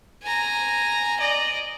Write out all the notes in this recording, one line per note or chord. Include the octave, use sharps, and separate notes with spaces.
G#5 A#5
D5 D#5